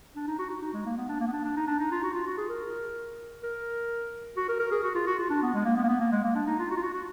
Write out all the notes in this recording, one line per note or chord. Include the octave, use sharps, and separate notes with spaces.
D4
D#4
F#4
F#4
D#4
G#3
A#3
B3
D4
A#3
B3
D4
D4
D#4
D4
D#4
F4
F#4
F4
F#4
G#4
A#4
A#4
F#4
A#4
A#4
G#4
F#4
F4
F#4
F4
D4
B3
G#3
A#3
B3
A#3
B3
A#3
G#3
A#3
D4
D#4
F4
F#4
F4
F#4
F#4